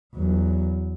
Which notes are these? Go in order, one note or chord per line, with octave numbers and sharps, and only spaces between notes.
E2 F#3